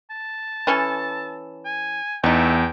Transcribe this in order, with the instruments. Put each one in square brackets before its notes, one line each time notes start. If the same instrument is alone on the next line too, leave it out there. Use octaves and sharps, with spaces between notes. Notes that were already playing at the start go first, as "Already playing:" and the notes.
[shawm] A5
[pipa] E3 C#4 A4
[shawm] G#5
[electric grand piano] E2 [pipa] A3 D#4 [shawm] G5